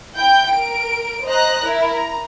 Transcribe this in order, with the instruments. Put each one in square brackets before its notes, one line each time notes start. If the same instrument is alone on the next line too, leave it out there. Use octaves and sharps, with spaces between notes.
[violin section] E4 G5 G6
A#4 D7
C5 D#5 A#5 F#6 A#6
E4 A#4
A#5